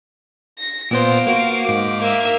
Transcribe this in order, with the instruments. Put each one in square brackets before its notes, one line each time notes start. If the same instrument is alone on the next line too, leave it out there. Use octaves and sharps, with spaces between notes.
[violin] A#6
[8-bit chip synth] A#2 B3 C5 [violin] F5 D7
[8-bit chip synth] A#3 F#4 C7
G#2 D6
[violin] A#3 E5